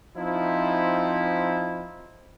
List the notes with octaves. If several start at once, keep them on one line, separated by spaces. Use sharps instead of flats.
F3 C4 D#4 E4